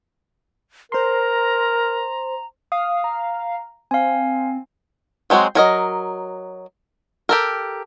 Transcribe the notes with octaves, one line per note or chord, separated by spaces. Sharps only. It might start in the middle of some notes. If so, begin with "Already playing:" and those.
A#4 C5 A#5 C6
F5 D#6
A#5
C4 F5 G#5
F#3 G#3 C4 F#4
F#3 A#4 D#5
G4 A4 A#4